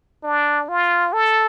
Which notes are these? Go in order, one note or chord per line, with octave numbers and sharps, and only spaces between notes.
D4
F4
A4